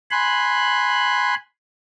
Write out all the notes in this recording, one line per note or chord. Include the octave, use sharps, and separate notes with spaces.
G#5 B5 C6 F#6